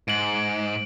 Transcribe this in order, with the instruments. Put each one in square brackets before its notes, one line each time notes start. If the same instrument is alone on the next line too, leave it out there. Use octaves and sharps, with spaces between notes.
[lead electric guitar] G#2 [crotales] D7 F#7